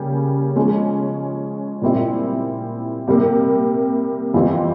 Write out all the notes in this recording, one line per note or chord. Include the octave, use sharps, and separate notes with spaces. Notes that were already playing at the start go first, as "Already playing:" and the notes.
Already playing: C#3 G3 A#3 C#4 G4
F3 G#3 C#4
A#2 G3 C4 E4
C3 G3 A#3
F2 E3 G3 C4 F4